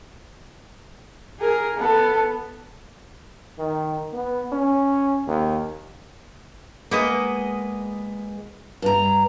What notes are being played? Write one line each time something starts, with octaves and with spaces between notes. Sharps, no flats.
G#4 A#4
B3 A4
D#3
B3
C#4
D#2
G#3 A#3 B3 D#5
G2 A#5